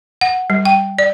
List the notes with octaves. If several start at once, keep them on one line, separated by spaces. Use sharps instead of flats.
F#5
G3
G5
D5